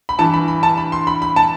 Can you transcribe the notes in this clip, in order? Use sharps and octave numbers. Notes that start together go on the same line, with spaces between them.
B5
G2 E3 A5
B5
B5
A5
B5
C6
B5
B5
A5